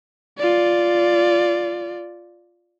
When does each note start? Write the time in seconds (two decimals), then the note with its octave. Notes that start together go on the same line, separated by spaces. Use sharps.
0.39 F4 D5